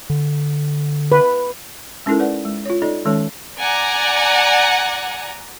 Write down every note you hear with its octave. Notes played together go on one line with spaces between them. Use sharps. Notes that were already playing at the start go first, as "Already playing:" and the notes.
D3
B4
G#3 C#4 D#4 E4 A4 A#4
B4 D5 F#5
G#3
F4 C#5
D#4 A4 D5 D#5
D#3 G#3 C#4 A4 C#5 A5
D5 F#5 G#5 A#5